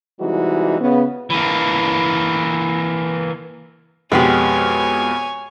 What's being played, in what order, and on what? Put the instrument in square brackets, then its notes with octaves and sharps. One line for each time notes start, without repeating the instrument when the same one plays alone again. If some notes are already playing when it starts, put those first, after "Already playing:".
[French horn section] C3 E3 G3 G#3 D#4 F#4
C#3 B3
[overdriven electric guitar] E3 A#3
[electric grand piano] F2 B2 [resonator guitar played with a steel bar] G#3 B3 G4 [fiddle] C#5 G#5